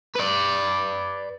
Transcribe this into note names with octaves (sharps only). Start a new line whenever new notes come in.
B4 D5